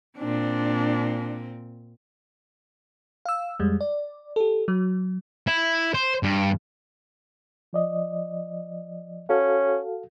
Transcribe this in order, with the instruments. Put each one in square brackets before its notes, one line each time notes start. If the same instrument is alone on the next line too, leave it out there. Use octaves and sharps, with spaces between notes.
[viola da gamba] A#2 C4 [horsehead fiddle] D4
[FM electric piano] F5 E6
F2 G3 G#3
D5
G4 A4
F#3
[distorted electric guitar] E4
C5
G2
[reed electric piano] F3 D5 D#5
[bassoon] C#4 [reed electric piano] F#4 A4 F5